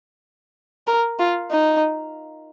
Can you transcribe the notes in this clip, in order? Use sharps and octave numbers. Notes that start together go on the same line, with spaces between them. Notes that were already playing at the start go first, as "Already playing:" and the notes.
A#4
F4
D#4